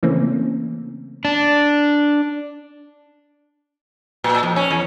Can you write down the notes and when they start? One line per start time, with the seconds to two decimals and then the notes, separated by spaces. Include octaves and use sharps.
0.03 C#3 E3 A3 A#3 C4 C#4
1.25 D4
4.24 A#2
4.43 F2
4.56 C#4
4.71 E2